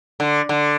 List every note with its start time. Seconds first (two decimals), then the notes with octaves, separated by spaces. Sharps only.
0.20 D3
0.49 D3